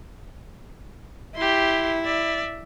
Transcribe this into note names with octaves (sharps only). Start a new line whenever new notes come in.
E4 G4 C6
D5 E5